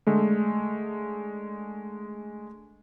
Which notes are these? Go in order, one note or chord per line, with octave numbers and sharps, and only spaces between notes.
D3 G#3 A3